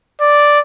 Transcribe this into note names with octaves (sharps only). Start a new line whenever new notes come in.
D5